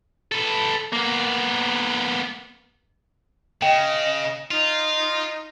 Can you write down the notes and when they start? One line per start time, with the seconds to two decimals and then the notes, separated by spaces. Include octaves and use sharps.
0.32 A4 B4
0.93 A#3 B3
3.62 C#3 D#5 G5
4.51 D#4 F4